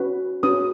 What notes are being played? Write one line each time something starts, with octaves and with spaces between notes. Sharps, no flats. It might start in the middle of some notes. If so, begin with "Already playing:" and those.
Already playing: C#4 F#4 B4
C#4 F#4 B4 D#6